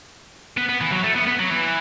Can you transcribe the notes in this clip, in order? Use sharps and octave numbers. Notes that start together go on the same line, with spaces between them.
B3
B3
E3
F#3
A3
B3
B3
F#3
E3